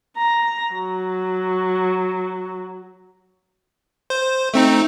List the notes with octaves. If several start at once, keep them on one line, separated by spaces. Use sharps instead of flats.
A#5
F#3
C5
A3 C4 D#4